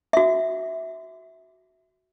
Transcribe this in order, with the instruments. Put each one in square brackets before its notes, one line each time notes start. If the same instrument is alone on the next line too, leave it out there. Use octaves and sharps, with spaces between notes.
[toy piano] F#4 E5